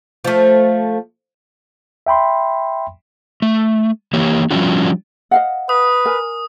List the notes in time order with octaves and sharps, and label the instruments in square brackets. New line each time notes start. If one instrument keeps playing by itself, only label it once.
[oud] F3 A3
[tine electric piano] E5 G5 B5 C6
[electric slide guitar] A3
E3 A#3 G4 C#5
F3 G3 C#4 D4 F4 F#4
[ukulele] D#5 F5 F#5
[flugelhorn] B4 [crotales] D#6
[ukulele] A#4 G#5